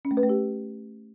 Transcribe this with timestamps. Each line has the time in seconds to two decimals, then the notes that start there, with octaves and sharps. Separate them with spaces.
0.05 C#4
0.11 A3
0.17 B4
0.23 A3
0.29 G4